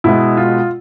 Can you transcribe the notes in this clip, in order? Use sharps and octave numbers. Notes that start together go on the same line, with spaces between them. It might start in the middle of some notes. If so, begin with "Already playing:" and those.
B2 G#3 B3 E4
F4